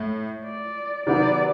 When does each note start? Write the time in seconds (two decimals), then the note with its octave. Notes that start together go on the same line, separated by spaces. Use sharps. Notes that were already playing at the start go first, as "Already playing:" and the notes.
Already playing: A2
0.44 D5
1.06 C3 D#3 F#3 B3 D5